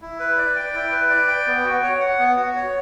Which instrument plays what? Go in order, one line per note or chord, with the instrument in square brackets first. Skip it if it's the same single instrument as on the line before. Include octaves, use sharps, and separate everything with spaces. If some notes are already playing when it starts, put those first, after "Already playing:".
[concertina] E4
B4
D5
G5
E4
B4
D5
G5
B3
F#4
C#5
F#5
B3
F#4
C#5